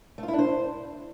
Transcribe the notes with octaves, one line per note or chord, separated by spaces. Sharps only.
A3
F4
E4
D4
C5